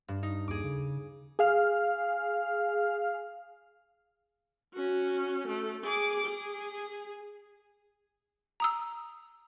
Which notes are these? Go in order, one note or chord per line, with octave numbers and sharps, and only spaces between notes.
G2
D#4
D#2 G#4 D6
C#3
G#4 F5 F6
C#4 F#4
A3
G#4 D6
G#4
A#5 D#6 E6